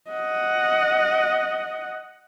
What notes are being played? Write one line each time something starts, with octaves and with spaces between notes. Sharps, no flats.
D#5 F#5